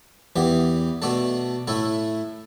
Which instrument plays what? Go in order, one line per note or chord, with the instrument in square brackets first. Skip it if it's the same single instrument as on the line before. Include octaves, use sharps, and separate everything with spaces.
[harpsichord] E2 E3 B3 G4
B2 A3 D4 A4
A2 A3 E4 A4